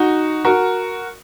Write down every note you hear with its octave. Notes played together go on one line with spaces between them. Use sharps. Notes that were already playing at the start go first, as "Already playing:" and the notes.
Already playing: D#4 F#4
F#4 A#4